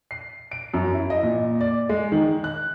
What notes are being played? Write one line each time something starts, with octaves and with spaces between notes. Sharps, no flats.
C7
D7
F#2
E4
D#5
A#2
D5
G#3
D#3
F#6